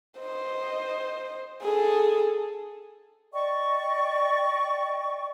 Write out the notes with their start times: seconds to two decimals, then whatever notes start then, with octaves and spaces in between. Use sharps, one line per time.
0.19 C5 D#5
1.62 G#4 A4
3.32 D5 D#5 G5 C#6